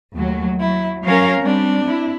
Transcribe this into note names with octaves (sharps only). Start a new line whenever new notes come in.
D#2 F#3 A3
F#3 E4
F#3 C#4 A#4 C#5 F5
G3 C4 D4
E4